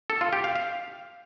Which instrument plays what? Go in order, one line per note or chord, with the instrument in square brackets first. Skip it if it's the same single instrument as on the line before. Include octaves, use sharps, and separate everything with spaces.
[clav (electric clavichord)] A4
F4
G4
F5
F5